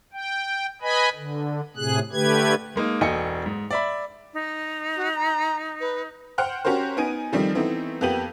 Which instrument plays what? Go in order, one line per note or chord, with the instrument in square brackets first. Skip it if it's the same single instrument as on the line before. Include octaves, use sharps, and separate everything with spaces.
[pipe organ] G5
B4 D#5 G#5 B5
D3
A2 C3 G#4 F#6
D3 A3 G4 B4 G#6
[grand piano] G#3 A#3 D#4
E1 A4 D#5 G5 G#5 C#7
G#2
D5 E5 B5
[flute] D#4
[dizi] F#4
A#5
B4
[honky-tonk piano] C5 F#5 G5 F6 F#6
C#4 F#4 G4 A#4 C5
B3 D#4 G#5 D7 D#7
D#3 F3 G3 A3 C4
E3 A3 B3 C4 D#4
F2 A#3 B3 G4 D#7 F#7